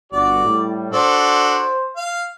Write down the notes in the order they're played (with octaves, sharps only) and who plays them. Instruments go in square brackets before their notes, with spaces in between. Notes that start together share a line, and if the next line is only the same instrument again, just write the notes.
[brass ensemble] G1 F#4 [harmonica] D5
[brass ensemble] A2 G3
[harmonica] D4 F#4 A4 [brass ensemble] C5
[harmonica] F5